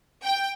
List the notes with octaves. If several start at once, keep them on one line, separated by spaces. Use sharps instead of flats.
G5